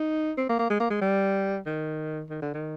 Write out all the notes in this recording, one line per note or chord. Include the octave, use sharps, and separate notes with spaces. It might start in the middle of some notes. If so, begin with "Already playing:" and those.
Already playing: D#4
C4
A#3
A#3
G#3
A#3
G#3
G3
D#3
D#3
D3
D#3